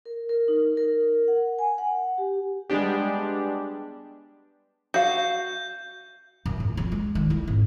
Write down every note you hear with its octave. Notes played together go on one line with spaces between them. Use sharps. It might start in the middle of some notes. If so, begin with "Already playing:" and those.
A#4
A#4
D#4
A#4
F#5
G#5
F#5
G4
G3 G#3 B3 D4 G4
F#4 F5 G6
F#2
E2
F2
G#3
D#3
E4
G#1